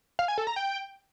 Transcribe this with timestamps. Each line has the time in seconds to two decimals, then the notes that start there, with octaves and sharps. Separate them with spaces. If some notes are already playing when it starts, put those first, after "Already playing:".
0.19 F5
0.28 G#5
0.38 A4
0.47 A#5
0.56 G5